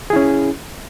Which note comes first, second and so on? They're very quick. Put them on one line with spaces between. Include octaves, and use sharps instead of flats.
G#4 E4 C#4